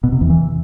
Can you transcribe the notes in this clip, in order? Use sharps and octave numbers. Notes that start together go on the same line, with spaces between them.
B2
C3
E2
E3